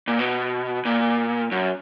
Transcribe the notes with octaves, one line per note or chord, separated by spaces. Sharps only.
A#2
B2
A#2
F#2